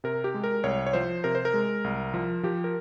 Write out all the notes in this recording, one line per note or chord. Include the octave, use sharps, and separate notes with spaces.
C3 A#4
G4
G#3
A#4
C2 C#5
C#5
F3 C5
C3 A#4
C5
A#4
G#3
C2
F3
F3 G4
A#4